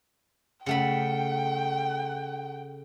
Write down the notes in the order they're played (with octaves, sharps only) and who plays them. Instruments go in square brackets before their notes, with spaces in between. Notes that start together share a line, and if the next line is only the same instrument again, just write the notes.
[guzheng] C#3 A3 B5 [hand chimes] F#5 C#7 [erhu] G5